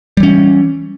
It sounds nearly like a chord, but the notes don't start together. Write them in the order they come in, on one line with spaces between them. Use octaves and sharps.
G3 E3 C#4